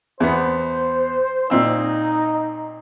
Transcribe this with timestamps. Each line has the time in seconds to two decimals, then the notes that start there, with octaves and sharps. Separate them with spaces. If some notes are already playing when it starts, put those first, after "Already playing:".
0.20 E2 B3 C5
1.50 A#2 C4 D#4 E6